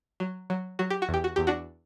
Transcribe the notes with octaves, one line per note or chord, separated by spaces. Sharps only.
F#3
F#3
F#3 F#4
G4
F#4
E2 G4
F#4
E2 G4
D4 F#4